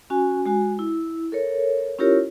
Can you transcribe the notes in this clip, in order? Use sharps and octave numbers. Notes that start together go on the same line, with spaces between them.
C#4 F#4 G#5
G#3 F#4 G#5
E4
A4 A#4 C#5
C#4 E4 F4 G4 A#4 C#5